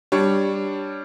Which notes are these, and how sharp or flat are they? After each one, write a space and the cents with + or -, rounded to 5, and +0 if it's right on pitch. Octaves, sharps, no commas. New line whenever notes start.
G3 +0 D4 +0 C#5 +0